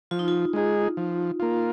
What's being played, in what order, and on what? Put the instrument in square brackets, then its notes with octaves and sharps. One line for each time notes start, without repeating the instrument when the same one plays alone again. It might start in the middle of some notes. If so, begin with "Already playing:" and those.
[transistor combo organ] F3 [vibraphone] F4
[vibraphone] D#4
F4
[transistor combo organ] G#3 D#4 G#4
F3
A#3 F4